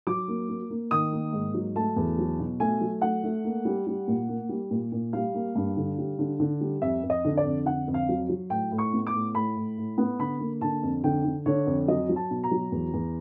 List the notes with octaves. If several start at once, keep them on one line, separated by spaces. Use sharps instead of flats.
F#3 D6
A#3
A#3
A#3
D#3 D#6
A#3
G#2
F#3
A3 A5
E2
F#3
B2
A3 G#5
F#3
A3 F#5
A3
A#3
G3
G3
A#2
A#3
G3
A#2
A#2
G3 F5
A#3
G2
D3
G3
D3
D3
G3
F2 E5
F2
D#5
D3
D5
F2
D3 F#5
F2
F5
F#3
F#3
A2 G5
A2
C#6
B3
D6
A2
A2 B5
A2
A2
B3
D3 B5
A#3
D3 A5
F2
D3 G5
D3
D3 C#5
F2
F#3 D#5
F#3
A5
B2
A#5
F#3
E2
E2